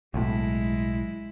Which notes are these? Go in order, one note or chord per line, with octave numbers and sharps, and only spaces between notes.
B1 A2 G#3 E4